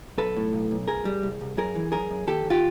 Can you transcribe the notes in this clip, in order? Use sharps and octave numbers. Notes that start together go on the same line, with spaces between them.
B1 A4 B4
A2
B1
B1
C2 G#4 A#4
G3
C2
C2
F#2 G#4 A#4
E3
F#2 G#4 A#4
F#2
D#2 G4 A4
D#2
F4 G4